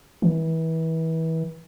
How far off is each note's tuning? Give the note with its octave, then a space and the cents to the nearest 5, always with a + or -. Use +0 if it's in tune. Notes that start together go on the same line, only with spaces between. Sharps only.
E3 -30